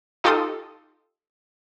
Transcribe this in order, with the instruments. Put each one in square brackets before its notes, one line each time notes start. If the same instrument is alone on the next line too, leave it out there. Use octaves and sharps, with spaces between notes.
[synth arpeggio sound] D#4 F4 G4 A4 C6 D#6